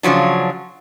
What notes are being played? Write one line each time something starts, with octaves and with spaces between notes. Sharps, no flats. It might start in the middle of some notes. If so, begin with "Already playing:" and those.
C#3 F3 F#3 D4